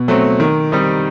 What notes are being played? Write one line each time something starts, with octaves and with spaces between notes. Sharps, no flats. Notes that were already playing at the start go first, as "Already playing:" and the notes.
Already playing: B2
F#3 A3 C4
D#3
G3 C4 D#4